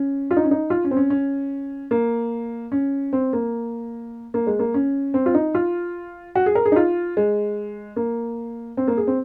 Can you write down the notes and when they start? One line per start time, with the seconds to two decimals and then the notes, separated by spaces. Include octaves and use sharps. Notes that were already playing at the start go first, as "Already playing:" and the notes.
Already playing: C#4
0.31 F4
0.36 D#4
0.44 C#4
0.51 D#4
0.70 F4
0.84 C#4
0.91 C4
0.97 C#4
1.10 C#4
1.91 A#3
2.72 C#4
3.13 C4
3.33 A#3
4.34 A#3
4.47 G#3
4.59 A#3
4.74 C#4
5.14 C4
5.26 F4
5.34 D#4
5.55 F4
6.35 F#4
6.46 G#4
6.55 A#4
6.66 G#4
6.72 D#4
6.76 F4
7.17 G#3
7.96 A#3
8.77 C4
8.88 A#3
8.97 G#4
9.07 C4